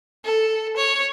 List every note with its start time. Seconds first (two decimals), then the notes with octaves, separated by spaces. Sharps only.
0.25 A4
0.77 C#5